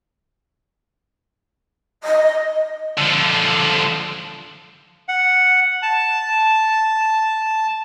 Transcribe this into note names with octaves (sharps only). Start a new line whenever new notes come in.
D#5
D3 F3
F#5
A5